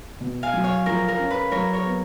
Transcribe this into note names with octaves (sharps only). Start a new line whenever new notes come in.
B2
F5 G#5
F#3
C#5 F5
F3 A#4
A#4
C#4
B4
F#3 A#4 C#5
A#4 C#5
B3